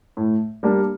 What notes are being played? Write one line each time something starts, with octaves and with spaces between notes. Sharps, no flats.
A2
G3 A#3 D4